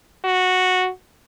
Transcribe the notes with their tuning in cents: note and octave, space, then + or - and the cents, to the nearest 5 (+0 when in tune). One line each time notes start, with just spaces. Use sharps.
F#4 -10